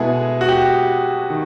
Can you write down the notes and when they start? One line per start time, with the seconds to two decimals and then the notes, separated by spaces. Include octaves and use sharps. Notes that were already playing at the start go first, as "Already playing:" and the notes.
Already playing: B2 G#3 B3 E4 G#4 A4
0.41 F#4
0.48 G4
1.30 D#3